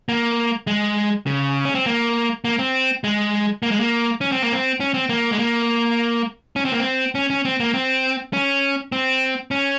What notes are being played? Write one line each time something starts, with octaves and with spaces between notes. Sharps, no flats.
A#3
G#3
C#3
C#4
C4
A#3
A#3
C4
G#3
A#3
G#3
A#3
C#4
C4
A#3
C4
C#4
C4
A#3
G#3
A#3
C#4
C4
A#3
C4
C#4
C#4
C4
A#3
C4
C#4
C4
C#4